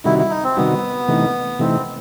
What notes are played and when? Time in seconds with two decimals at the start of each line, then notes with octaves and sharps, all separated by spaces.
0.04 C3 D#3 G3 D#4 E4 F#4
0.18 E4
0.30 D#4
0.44 C4
0.57 C3 D#3 G3 B3 D#4 F#4
1.08 C3 E3 A3 D#4
1.59 C3 E3 A3 C4 D#4